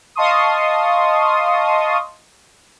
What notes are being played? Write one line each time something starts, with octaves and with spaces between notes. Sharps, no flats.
D#5 F5 A5 C6 C#6 D#6